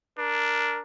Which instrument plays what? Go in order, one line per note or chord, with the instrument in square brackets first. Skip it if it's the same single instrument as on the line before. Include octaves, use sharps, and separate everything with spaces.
[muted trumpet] D4 [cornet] A#4